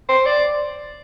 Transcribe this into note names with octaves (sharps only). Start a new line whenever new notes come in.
C5
D5